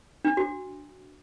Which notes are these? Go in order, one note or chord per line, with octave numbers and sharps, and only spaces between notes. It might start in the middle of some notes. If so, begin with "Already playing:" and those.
D4
F#4